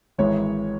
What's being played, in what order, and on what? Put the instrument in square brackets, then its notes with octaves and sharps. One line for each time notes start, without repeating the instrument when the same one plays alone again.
[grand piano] G#1 G#2 E3 G#3 C#5